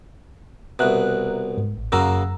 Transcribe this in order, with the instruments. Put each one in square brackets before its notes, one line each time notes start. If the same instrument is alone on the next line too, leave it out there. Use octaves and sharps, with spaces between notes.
[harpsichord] C2 B2 [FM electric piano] E5 A#5 F#6
[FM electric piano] G#2
A1
[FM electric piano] F#2 A#5 E6 [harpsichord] C#3 A#3 F#4